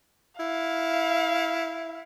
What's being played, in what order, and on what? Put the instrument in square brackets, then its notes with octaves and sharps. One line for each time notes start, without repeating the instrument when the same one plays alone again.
[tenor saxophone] E4 [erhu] F5